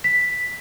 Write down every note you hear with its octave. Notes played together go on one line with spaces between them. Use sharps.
B6